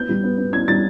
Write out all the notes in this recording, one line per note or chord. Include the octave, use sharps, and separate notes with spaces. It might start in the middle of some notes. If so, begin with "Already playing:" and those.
Already playing: B3 G6
G3
B3
B3
B3 G#6
G3 A6